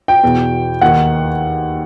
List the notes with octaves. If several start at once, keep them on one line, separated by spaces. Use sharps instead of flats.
G5
E2 B2
D#2 D#3 F#5